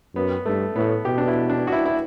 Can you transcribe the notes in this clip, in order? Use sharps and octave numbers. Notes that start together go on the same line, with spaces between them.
F#2 B3
G2 A3
A2 B3
B2 G4
D4
E4
D4
F#4
E4
E4